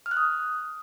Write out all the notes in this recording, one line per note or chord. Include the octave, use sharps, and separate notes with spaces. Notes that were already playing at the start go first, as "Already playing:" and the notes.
F6
F#6
D#6